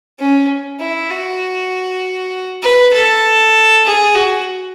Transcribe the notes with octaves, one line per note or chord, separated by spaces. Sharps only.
C#4
E4
F#4
B4
A4
G#4
F#4